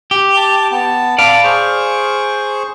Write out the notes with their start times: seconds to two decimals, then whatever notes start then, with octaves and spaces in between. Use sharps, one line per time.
0.11 G4
0.37 A5 D6
0.71 B3 A5
1.18 D5 F5 A5 B5
1.44 G#4 C5 C#6